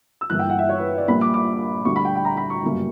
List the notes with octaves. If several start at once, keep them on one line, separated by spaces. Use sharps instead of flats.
E6
G1 G2 E3 A#3 F#6
G5
F#5
E5
C#5
B4
D5
A#1 A#2 G3 A#3 B5
D6
D6
D2 D3 G3 C#6
B5
G5
G5
A#5
B5
C#6
G1 F#2 C#3 G3 A#3